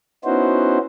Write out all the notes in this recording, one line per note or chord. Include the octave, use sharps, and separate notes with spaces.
B3 C#4 D#4 E4 F#4 C5